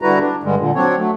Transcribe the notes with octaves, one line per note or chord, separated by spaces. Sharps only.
D3 G3 E4 F#4 B4 A#5
D4
G2 D3 G3 G#3
A#2 D3
F#3 C4 D4 C#5
F#3 A3